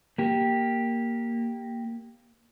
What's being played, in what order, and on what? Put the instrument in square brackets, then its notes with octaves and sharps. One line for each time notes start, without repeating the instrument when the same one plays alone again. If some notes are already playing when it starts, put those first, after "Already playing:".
[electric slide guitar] A#3 G4